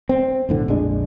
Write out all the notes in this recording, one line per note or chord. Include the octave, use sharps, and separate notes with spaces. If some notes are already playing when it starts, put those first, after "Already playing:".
C4
B1 A2 D3
A#1 F2 G#3 D4